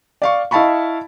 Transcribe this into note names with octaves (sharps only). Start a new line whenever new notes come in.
D5 F5 C#6
E4 D#5 F5 A5 B5 C#6